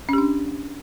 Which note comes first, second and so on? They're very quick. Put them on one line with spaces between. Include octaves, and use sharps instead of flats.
C#4 G4 D4